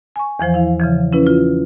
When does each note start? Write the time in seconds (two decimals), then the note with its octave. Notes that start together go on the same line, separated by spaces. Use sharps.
0.16 G#5 C#6
0.39 E2 E3 F3 C5
0.54 E4 F5
0.80 C#3 E3 F3
1.13 C#4 E4 B4
1.27 F4